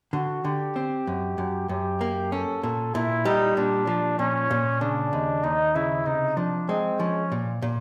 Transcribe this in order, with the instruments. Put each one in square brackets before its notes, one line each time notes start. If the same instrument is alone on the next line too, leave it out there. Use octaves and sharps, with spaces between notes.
[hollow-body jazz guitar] D3 [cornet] F#4
[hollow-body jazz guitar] D3 [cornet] G4
[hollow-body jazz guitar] C4
F#2
F#2
[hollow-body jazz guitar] F#2 [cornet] G4
[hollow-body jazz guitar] A#3
[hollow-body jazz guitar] C#4 [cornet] A4
[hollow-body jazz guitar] A#2 [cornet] A4
[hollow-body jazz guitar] A#2 [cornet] E4
[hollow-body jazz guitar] G3 [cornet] D#4
[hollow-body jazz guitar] A#2 [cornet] D4
[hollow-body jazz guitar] F3
[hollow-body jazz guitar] A#2 [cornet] C#4
[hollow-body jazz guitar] A#2
[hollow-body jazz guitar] C#3 [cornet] D4
[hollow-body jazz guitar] D#2
[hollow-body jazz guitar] D#2 [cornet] D#4
[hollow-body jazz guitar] C#3 [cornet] E4
[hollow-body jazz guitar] C3 [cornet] D#4
[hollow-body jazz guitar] F3 [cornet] D4
[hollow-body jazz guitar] G#3 [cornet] C4
[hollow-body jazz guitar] F3 [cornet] C#4
[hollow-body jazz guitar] A#2
A#2